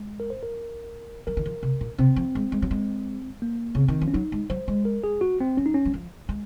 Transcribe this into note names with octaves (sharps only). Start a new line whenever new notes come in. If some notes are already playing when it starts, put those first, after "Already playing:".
Already playing: G#3
A#4
C5
A#4
F#3 A#4
D#3
F3
C3
A#2
C3 C4
F3
G#3
G#3
F#3
G#3
A#3
C#3 C4
D#3
F3
C#4
F#3 D#4
G#3
F#3 C5
G#3
A#4
G#4
F#4
C4
F#3 C#4
D#4
C#4
F#3
F3
G#3